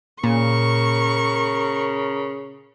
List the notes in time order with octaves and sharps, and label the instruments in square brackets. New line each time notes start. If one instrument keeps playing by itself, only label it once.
[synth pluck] A#2 [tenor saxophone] C#3 [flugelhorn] A#4 [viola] C#6